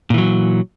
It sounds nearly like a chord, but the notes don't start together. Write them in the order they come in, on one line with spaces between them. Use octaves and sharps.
A#2 E3 F#3